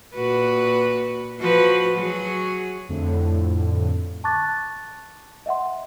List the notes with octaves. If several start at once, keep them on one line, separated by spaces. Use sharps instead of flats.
A#2 F#4 B4
F3 F#4 B4
F#3 F#4 G#4
F2 A2 D3
A5 C#6 D6 F#6 A6
D#5 E5 F#5 C6